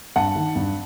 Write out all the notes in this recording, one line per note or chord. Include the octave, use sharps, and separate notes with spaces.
G2 F#5 A5
D#3
G2